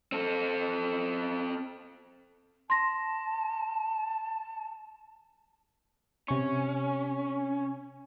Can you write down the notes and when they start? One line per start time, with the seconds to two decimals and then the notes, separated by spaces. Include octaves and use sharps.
0.12 C4 A4
2.70 A5 C6 A#6
6.28 C3 C#4 C#6